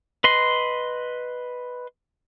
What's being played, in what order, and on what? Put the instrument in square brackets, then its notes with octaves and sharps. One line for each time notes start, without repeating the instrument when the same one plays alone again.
[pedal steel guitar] B4 D#5 C6